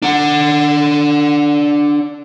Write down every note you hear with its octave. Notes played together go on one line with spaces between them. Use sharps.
D4 F#5